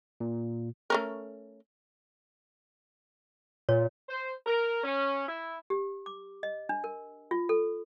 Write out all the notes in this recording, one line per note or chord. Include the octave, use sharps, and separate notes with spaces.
A#2
A3 C#4 A#4
A#2 C#5
C5
A#4
C#4
E4
G4
D6
D#5
D4
A#4
F4
A4